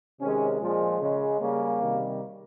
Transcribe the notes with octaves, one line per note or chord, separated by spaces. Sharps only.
C3 D#3 G#3 C#4
A#2 F3 G#3
C#3 G#3
C#3 G3 A#3
C3 D#3 G3